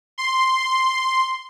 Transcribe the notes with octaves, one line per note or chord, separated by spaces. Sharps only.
C6